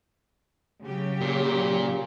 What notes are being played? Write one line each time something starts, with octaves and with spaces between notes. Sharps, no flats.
C#3 F#3 G4
A#2